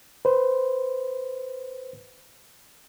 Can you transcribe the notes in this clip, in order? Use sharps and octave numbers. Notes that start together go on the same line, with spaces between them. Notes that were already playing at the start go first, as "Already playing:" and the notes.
B4 C5